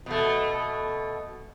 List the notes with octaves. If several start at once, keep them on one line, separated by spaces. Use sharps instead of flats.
B2 A3